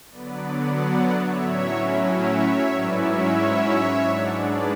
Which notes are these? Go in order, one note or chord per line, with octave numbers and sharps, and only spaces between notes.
D3 F#3 B3 B4 D5
D5 F#5
D5 F#5
C#5 E5
A2 F#3 C#4 E4
C#5 E5
G#2 F#3 C#4 E4 B4 D5
C#5 E5
G#2 G#3 D4 D5 F#5
B4 D5